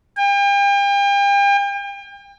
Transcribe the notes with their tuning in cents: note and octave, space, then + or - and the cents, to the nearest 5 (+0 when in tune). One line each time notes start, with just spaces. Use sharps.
G5 +40